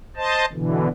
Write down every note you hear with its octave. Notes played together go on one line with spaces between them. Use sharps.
C5 D#5 A5
B2 D3 E3